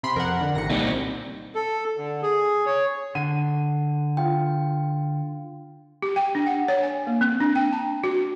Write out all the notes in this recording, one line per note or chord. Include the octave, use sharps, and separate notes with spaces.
C3 B5 C6
F2 A#4 F#5
D3
G#1 C3 A#6 C#7
C2 A#2 G3 C4 D#4
A4
D3
G#4
C#5
D3 F#5 D#7
F4 G5
G4
G5
D4
F#5
C#5
G#5
A#3
C4
D4
G5
A5
F#4